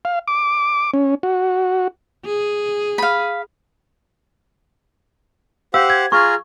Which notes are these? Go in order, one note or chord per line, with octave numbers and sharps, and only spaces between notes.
F5
D6
C#4
F#4
G#4
F5 B5
G4 C5 F5 F#5 E6
G#6
F4 G#4 A#5 C#6 F6